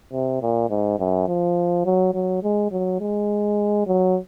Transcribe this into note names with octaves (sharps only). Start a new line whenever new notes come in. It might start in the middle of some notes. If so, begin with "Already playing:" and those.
C3
A#2
G#2
F#2
F3
F#3
F#3
G#3
F#3
G#3
F#3